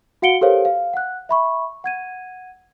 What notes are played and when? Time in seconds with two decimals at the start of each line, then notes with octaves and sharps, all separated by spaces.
0.22 F#4 F5 F#5 C#7 D7 G7
0.41 G4 A4 A#4 C5 C#5 F5
0.65 F5
0.93 F#5 F#6
1.29 E5 B5 C#6
1.84 F#5 G#6 D#7